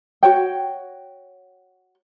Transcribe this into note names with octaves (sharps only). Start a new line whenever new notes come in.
F#4 C#5 G5